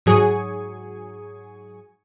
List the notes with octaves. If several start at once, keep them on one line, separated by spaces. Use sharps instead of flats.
G#2 F#3 G#4 G#5 C#6